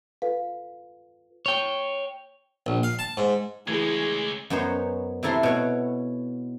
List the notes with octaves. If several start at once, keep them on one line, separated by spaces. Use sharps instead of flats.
F4 A4 B4 F5
C#5 G5
A#1
F5
A5
G#2
C#3 E3 G#3 A3 G#4 G#6
F#2 B3 D#4 C5 C#5
C3 A3 E4 A5 A#5 C6
B2 C#5 F#5